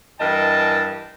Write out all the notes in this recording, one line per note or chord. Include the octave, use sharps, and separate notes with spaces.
G2 E3 A#4 D#5 G5 A5